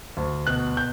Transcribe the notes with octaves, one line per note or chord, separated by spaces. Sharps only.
D2
B2 F#6
G6